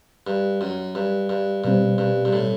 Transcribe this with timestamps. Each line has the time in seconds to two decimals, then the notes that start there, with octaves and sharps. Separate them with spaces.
0.27 G2
0.61 F#2
0.95 G2
1.29 G2
1.64 G2 B2 G3 C4
1.98 G2
2.25 G2
2.33 A2